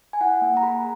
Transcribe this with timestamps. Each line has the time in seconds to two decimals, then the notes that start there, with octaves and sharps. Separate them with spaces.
0.13 G#5
0.21 E4 F#5
0.41 A#3
0.57 A#5
0.63 G#4 B5